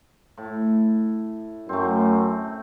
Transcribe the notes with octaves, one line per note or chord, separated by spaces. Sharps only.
A2
F#2 A3 C4